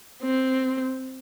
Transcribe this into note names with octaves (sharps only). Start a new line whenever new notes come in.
C4